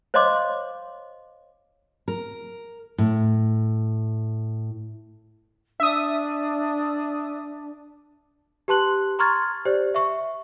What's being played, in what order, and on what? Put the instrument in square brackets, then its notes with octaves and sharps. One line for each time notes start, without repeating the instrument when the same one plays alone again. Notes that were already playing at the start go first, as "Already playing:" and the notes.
[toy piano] C5 C#5 D#5 F5 C6 D6
[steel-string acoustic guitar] A#4
A2
[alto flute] D4 [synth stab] E5 D#6
[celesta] G4 B4 A5 C6 F#6 F#7
A#5 C6 C#6 F6 G#6 A6
G4 C5 D5
E5 C#6